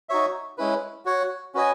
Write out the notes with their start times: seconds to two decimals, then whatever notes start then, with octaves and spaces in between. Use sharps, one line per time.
0.09 D#4 F#4 C#5 E5
0.58 G#3 C#4 E4 B4
1.05 F#4 C#5 F#5
1.54 C#4 F#4 B4 D#5 G#5